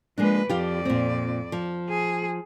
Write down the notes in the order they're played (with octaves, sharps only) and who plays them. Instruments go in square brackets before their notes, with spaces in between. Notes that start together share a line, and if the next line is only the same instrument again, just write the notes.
[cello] F3 B4 [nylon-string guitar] G#3 A#3 D4
[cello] F2 D5 [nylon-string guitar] F3 F4 G4
[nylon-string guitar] A#2 C4
F3
[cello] G#4